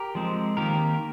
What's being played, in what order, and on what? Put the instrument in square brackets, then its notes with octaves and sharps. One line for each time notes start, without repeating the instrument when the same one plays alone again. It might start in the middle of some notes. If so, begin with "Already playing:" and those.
Already playing: [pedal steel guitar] G4 A#4
F3 G#3 C4
D#3 A#3 G4 A#4